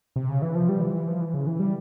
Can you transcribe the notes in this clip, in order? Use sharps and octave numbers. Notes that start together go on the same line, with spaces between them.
C3
C#3
E3
F3
G3
E3
E3
F3
E3
C#3
E3
G3